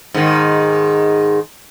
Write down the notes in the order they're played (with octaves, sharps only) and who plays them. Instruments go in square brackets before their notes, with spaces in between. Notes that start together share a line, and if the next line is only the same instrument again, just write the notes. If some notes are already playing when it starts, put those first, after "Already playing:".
[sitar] G#2 D#3